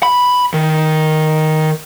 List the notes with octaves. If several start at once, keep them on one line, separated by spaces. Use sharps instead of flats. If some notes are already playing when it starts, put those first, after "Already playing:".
B5
D#3